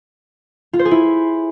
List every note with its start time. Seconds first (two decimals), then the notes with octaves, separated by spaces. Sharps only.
0.73 F4
0.79 C5
0.85 G#4
0.91 E4